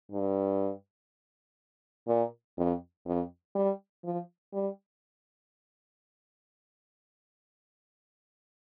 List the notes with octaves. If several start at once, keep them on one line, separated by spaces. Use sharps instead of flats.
G2
A#2
F2
F2
G3
F3
G3